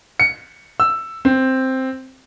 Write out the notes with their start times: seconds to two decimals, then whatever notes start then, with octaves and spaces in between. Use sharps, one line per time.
0.20 C#7
0.80 E6
1.25 C4